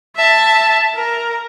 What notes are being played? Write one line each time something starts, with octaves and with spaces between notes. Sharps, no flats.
E5 A5
A#4